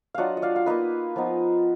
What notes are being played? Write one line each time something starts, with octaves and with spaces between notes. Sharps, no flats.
F#3 D4 F4 D#5 F5 F#5
D#5
D5 F5
F5
A#3 D#4 B4 D#5
F3 B3 D#4